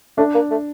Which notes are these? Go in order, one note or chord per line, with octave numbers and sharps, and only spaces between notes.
A3 D4
A#3
A3